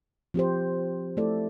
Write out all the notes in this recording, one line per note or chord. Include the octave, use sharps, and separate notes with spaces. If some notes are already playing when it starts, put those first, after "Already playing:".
F3 C4 G4 C5
A3 E4 A4 D5